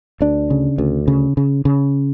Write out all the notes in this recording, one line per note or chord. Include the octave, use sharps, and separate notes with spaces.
D2 D4
C#3
D2
C#3
C#3
C#3